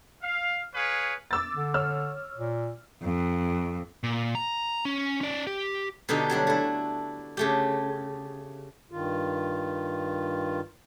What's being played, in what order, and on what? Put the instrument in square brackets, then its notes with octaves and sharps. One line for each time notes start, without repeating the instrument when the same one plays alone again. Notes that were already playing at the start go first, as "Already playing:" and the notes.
[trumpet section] F5
G#4 B4 C#5 F5
[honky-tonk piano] D6 E6 A6
[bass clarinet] D3
[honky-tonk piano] C#5 E6 F6
[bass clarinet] A#2
[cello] F2
[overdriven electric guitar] A#2
A#5
C#4
C#4 D5
G4
[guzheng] B2 D3 D#4 G4 A4
F#3 G3 D4 F#4
A3 E4
C#3 A3 G4
[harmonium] G2 D#3 F4